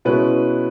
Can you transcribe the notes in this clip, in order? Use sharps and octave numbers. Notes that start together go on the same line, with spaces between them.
B2 G#3 C#4 E4 B4